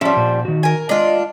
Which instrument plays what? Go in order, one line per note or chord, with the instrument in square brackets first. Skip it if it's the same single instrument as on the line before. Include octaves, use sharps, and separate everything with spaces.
[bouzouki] F3 G3 [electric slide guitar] C#4 E5
[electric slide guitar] A#2 C5
D#3 F#4
[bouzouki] A#4 G#5
[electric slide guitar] G#3 D#5 [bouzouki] D4 F4